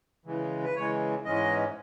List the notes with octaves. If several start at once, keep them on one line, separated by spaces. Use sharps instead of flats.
C#3 E3 G#3
B4
C#3 E3 G#3 C#5
G#2 E3 G#3 C#4 D#5